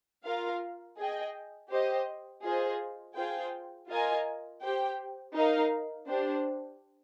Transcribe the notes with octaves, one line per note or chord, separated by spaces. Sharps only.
F4 A#4 F5
G#4 D#5 G5
G4 C5 D#5
F4 G#4 C5 D#5
F4 G#4 C5 G5
F4 A#4 D#5 G#5
G4 C5 G5
D#4 A#4 F5
D4 G4 C5